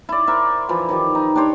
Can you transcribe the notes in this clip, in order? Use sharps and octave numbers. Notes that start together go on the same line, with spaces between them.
E4 D5
A#4 C5 E5
E3 F3 B5
D#3 F3 G4
D#4
D4 G4 C5 C#5